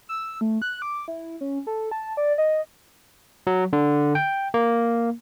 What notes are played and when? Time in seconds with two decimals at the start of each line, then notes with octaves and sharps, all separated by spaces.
0.09 E6
0.41 A3
0.62 F#6
0.82 D6
1.08 E4
1.41 C#4
1.67 A4
1.91 A5
2.17 D5
2.38 D#5
3.47 F#3
3.73 D3
4.15 G5
4.54 A#3